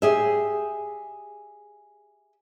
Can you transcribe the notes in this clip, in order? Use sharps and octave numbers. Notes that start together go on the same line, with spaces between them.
G4 G#4 E5